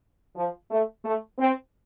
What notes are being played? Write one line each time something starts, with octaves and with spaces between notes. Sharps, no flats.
F3
A3
A3
C4